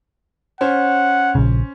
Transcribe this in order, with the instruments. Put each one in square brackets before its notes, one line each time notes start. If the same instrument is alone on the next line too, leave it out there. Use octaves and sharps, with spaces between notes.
[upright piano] C#4 C5 [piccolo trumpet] F#5
[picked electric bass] A#1 C#3